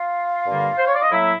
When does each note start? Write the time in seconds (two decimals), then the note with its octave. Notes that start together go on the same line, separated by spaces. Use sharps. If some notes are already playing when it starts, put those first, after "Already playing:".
Already playing: F4 F5
0.46 G2 D3 G3 A#3
0.77 C5
0.87 C#5
0.94 D5
1.02 D#5
1.11 A2 F#3 A#3 E4 E5